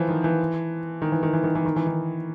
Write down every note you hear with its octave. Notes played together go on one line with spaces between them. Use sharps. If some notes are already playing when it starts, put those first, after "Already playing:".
Already playing: E3 F3
D#3
E3
D#3
E3
D#3
E3
D#3
E3
D#3
E3
D#3